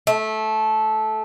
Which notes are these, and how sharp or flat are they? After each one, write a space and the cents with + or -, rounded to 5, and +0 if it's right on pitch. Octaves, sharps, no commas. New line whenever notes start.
A3 -15